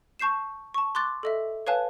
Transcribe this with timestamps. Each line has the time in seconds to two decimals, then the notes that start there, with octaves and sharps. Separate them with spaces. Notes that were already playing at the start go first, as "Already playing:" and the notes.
0.19 A5 C#6 G6 C7 E7
0.74 A5 C#6
0.95 C6 D6 F#6 A6
1.23 A4 D#5 E5
1.67 B4 C#5 F5 G#5 A5 F#6